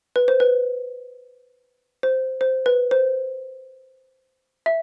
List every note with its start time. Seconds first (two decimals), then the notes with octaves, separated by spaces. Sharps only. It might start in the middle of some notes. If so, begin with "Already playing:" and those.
0.16 B4
0.28 C5
0.40 B4
2.03 C5
2.41 C5
2.66 B4
2.91 C5
4.66 E5